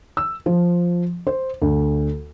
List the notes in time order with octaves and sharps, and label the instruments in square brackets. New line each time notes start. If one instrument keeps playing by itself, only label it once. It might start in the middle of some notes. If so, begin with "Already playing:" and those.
[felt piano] E6
F3
C5
D2